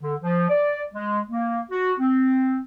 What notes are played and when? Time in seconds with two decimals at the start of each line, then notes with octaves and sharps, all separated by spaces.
0.02 D3
0.22 F3
0.49 D5
0.94 G#3
1.30 A#3
1.71 F#4
2.00 C4